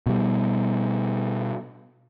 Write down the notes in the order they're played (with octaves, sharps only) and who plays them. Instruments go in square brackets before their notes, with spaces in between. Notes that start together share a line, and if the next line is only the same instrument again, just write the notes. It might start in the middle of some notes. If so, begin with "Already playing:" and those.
[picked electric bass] B2 G3